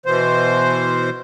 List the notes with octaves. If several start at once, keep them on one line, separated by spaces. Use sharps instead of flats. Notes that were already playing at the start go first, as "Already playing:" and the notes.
B2 E3 C5